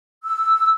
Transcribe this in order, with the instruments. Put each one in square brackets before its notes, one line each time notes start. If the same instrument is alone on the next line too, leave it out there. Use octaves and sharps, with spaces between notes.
[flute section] E6